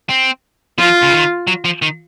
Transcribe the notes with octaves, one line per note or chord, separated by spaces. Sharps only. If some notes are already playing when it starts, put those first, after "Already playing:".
C4
F3 F4
C#3
D#3
F#3
F3
D#3